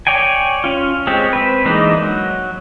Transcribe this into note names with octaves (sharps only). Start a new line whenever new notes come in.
C#5 D5 G5 G#5
C#4 F4
G#3 C4 G4 C#5
C4 B4
E3 G#3 A#3 D4 D#4
F#3